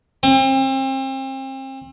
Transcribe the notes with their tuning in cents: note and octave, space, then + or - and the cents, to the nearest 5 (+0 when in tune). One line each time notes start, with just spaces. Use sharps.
C4 +35